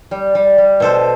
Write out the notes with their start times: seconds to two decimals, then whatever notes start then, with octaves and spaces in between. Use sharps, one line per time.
0.11 G3
0.35 G3
0.58 G3
0.80 B2 A4 C5